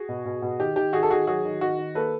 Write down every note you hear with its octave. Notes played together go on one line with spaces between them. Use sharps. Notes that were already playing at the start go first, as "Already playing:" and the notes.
Already playing: F#4 G#4
B2
B2
B2
D#3 G4
D#3 G4
D#3 F#4 G#4
A4
D#3 F#4 G#4
F#3 F#4 G#4
D#3
D#3 F#4
D#3
A#3 A4 B4